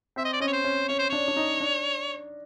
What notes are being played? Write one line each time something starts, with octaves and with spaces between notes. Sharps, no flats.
C4 E5
D#5
D5
C#4 D#5
C#5
C5
C#4
C#4 C#5
C5
D4 C#5
D4
D#4
D4